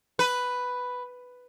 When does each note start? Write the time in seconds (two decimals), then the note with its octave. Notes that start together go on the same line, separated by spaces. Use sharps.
0.19 B4